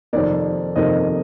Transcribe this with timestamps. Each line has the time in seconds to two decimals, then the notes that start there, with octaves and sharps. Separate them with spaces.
0.13 F2 C3 D#3 A#3 D5
0.76 F2 C3 D#3 A#3 D#5